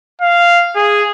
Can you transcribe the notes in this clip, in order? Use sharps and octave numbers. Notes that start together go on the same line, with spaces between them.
F5
G#4